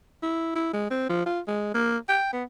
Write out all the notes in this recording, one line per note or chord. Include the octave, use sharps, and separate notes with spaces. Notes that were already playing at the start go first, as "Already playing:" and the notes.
E4
E4
G#3
C4
F3
F4
G#3
A#3
G5
B3